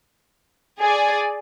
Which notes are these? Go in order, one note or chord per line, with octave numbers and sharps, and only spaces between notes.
G#4 D5 G#5